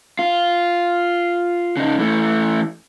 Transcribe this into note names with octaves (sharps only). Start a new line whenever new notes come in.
F4
C#3 D#4
E3 A3